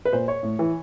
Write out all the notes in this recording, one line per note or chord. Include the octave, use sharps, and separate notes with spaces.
B4
A#2 C5
C#5
A2
E3